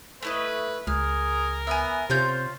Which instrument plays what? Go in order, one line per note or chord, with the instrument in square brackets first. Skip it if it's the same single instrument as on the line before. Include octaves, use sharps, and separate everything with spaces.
[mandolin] A3 E4 D#5 [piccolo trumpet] B4
[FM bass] C#2 [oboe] G#4 [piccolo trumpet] A#4 [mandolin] F6
[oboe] B3 [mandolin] E5 G#5
[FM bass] C3 [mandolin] C#4 F4 G6 [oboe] C5